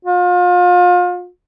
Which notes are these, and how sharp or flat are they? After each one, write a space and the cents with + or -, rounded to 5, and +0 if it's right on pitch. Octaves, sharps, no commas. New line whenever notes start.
F4 +35